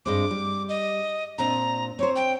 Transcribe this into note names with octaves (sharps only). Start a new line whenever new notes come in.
G2 G#3 C4 D6
G3
D#5
A#2 C4 D4 A#5
C4 C5 C#5
G5